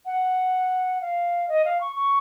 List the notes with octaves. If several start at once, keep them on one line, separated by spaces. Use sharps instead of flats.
F#5
F5
D#5
F5
C#6
C#6